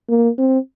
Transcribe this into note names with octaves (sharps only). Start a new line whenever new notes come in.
A#3
C4